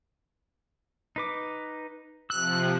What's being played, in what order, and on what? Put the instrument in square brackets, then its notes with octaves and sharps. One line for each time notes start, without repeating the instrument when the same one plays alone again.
[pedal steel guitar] D#4 B4 D6
[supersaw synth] C3 F3 [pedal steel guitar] E6 [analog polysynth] F#6